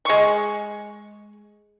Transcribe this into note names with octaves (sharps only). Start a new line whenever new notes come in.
G#3 C#6